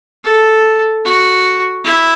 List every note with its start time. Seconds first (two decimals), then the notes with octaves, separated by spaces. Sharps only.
0.25 A4
1.05 F#4
1.84 E4